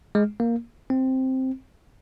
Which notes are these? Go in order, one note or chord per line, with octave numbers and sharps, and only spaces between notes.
G#3
A#3
C4